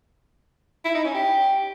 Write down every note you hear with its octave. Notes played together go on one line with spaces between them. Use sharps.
E4
D#4
C#4
G4